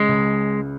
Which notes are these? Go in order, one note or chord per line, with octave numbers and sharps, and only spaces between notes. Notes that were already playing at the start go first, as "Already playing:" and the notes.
Already playing: C#3 G#3
C#2